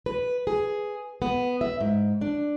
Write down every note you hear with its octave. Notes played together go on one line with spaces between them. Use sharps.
B4
G#4
B3
E5
G#2
D4